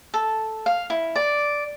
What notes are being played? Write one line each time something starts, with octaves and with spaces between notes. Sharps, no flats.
A4
F5
E4
D5